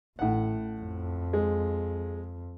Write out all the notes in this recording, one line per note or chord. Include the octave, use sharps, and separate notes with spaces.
A1 A2 F#5
F2
G#3